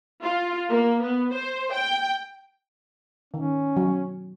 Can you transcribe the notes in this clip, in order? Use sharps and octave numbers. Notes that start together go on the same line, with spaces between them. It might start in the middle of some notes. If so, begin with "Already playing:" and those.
F4
A#3
B3
C5
G5
D#3 C#4
F#3